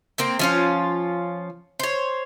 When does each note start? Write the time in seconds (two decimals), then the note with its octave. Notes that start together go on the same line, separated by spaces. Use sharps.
0.18 A#3 C4 G5
0.39 F3 C#4 F4
1.79 C5 C#5